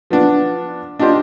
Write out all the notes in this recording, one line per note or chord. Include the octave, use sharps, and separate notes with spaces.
F3 B3 D4
D4 D#4 F4 G4 C5